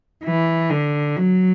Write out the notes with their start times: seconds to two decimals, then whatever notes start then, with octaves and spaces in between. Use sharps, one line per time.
0.24 E3
0.70 D3
1.17 F#3